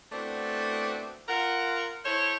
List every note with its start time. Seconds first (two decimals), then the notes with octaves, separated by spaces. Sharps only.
0.12 A3 B3 C4 D4 E4 F#4
1.29 F4 A#4 F#5
2.05 E4 A4 C5 C#5